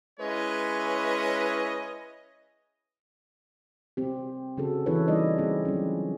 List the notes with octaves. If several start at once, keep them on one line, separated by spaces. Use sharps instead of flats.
G#3 C#4 E4 B4 C#5 D#5
C4 G4
C#3 C#4 F#4 G#4 A4
E3 C4 E4 A4 B4 C#5
E3 G3 A#3 D#4 D5 D#5
E3 C4 D#4 G#4
F3 F#3 C#4